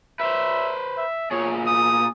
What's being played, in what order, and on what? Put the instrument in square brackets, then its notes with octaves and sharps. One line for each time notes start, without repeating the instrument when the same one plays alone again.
[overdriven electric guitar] B4 C5 [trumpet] E5
[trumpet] E5
[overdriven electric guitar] A#2 G#4 [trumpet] C#5
[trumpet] D#6